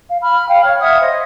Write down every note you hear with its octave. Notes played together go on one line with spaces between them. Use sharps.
F5
B5 F6
F5 G5
C#5 F6
E5 F#5 D#6 G#6
C5 D#5